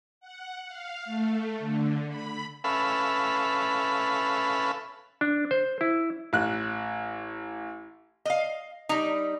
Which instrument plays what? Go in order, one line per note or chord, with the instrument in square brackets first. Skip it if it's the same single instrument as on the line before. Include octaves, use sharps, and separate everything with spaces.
[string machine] F#5
F5
A3
D3
B5
[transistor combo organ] C#4 A4 B4 E5 F5 B5
[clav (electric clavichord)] D4
C5
E4
[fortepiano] A1 F#6
[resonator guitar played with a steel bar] D#5 F5
G3 D#4